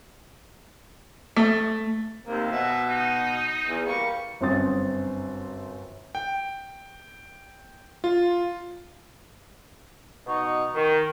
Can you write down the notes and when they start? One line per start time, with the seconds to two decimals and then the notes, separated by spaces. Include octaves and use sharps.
1.36 A3
2.26 D#2 C3 A#3
2.52 B2 E5
2.89 D#4
3.69 E2
3.86 G3 A#3 C#6
4.41 G1 F#2 C4 C6 D#6 A6
6.15 G5
8.04 F4
10.27 B2 D#4 C#6
10.74 D#3